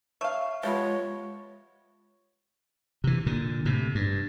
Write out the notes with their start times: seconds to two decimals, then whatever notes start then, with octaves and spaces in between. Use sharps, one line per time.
0.21 C#5 E5 F5 A5 C#6
0.63 F3 G#3 B3 F4 G4 C#5 E5
3.04 C3 E3
3.26 A#2 D3
3.65 A2 C3
3.95 G2